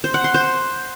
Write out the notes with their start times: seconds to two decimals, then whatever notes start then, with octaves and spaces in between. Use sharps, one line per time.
0.04 C5
0.14 F#5
0.24 C6
0.34 C5